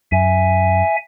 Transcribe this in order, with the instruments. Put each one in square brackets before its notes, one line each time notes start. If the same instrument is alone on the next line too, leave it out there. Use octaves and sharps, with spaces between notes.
[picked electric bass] F#2 [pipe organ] E5 G#5